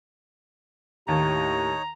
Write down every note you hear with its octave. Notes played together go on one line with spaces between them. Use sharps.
D#2 A2 D#4 G4 C#5 A#5